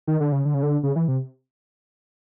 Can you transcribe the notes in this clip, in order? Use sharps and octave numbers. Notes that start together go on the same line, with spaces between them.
D#3
D3
C#3
D3
C#3
D3
C#3
E3
C3